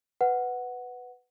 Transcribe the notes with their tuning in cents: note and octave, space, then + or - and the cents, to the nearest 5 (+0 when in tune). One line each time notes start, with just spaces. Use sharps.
B4 +10 F#5 +0